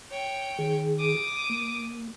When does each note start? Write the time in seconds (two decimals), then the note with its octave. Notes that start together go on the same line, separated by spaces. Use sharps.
0.11 C#5 G5
0.58 D#3 G#4
0.99 D6 D#6
1.50 A#3